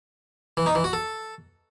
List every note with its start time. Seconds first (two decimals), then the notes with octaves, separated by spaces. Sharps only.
0.57 E3
0.66 D#4
0.75 E3
0.84 F#4
0.93 A4